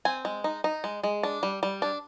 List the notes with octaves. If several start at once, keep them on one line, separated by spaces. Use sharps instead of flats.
C4 G#5
G#3
D#4
D#4
G#3
G#3
D4
G3
G3
D4